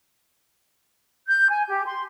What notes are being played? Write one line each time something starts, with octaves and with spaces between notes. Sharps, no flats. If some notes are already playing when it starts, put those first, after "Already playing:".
G6
G#5
G4
C6